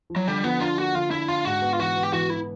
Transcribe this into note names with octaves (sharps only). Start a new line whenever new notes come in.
F3
F#3
D3 G3
F3 B3
D4 F4
A#3 F#4
D3 F4
D4 E4
D4 F4
G#2 F#4
B3
F4
E3 F#4
B3
G4
E3 F#4
E3 E4